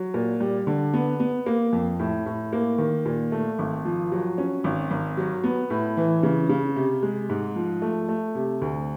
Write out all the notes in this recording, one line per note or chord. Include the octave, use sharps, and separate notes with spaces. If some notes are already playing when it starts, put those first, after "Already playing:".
Already playing: F#3
A#2
G3
D3
B3
B3
A#3
F2
A2
A2
A#3
D#3
A#2
A3
G#1
F3
F#3
C#4
G#1
G#1
F#3
B3
A2
E3
C#3
C#3
C3
G#3
G#2
F3
A3
A3
C3
D2